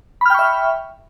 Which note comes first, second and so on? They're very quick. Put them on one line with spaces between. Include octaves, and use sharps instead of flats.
B5 F6 G5 C#6 E5